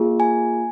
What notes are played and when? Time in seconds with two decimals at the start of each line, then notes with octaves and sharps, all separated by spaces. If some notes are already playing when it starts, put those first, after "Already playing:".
Already playing: A#3 F4 G#4
0.20 G#5